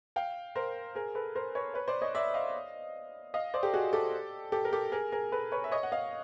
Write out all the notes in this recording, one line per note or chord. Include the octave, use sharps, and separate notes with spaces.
F5 G5
A#4 C5
G#4 A#4
A4 B4
A#4 C5
B4 C#5
B4 C#5
C5 D5
C#5 D#5
D5 E5
D#5 F5
D#5 F5
C5 D5
G4 A4
F#4 G#4
G4 A4
G4 A4
A#4
G4 A4
G#4 A#4
G#4 A#4
A4 B4
B4 C#5
E5
C#5 D#5
F#5
D#5 F5